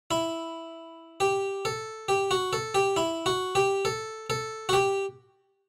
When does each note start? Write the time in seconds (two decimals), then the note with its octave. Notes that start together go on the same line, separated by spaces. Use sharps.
0.11 E4
1.20 G4
1.65 A4
2.08 G4
2.31 F#4
2.53 A4
2.75 G4
2.97 E4
3.26 F#4
3.55 G4
3.85 A4
4.30 A4
4.69 F#4
4.73 G4